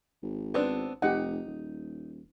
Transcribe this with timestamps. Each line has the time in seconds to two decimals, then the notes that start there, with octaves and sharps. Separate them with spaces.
0.23 G#1
0.54 B3 C4 D4
1.02 F1 D#4 G4 F#5
1.47 D#1